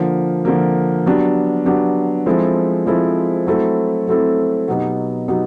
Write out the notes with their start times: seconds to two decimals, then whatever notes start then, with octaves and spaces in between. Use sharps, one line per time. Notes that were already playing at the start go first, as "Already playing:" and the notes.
Already playing: D3 F3 A#3
0.45 D3 F3 A#3
1.06 F#3 B3 D4 G4
1.66 F#3 B3 D4 G4
2.26 F3 G#3 C4 E4 A4
2.86 F3 G#3 C4 E4 A4
3.47 F#3 A3 C4 E4 A4
4.07 F#3 A3 C4 E4 A4
4.68 B2 F#3 B3 D#4 G4
5.28 B2 F#3 B3 D#4 G4